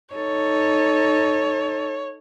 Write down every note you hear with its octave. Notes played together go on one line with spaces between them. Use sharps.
D#4 A4 C#5